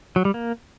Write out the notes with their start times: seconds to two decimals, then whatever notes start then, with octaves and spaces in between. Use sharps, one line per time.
0.16 F#3
0.25 G3
0.34 A#3